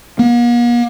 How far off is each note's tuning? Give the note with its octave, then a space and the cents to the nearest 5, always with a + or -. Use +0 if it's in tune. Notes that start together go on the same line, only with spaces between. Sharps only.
A#3 +45